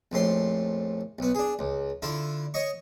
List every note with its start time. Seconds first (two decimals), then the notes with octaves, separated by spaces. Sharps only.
0.12 A#1 F2 A2 C6
1.19 B1 B3
1.35 D4 G#4
1.59 C#2
2.02 D3 E4 F4
2.54 C#5 D#5 C#6